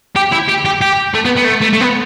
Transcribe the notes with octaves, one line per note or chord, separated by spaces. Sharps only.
G4
E4
G4
G4
G4
A3
B3
B3
A3
A3
A3
B3